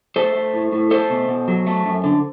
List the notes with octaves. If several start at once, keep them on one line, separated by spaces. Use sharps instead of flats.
A3 A4 C5
A3
A2
A2
A3 A4 C5
B2
B2
F#3
A3
F#2
D3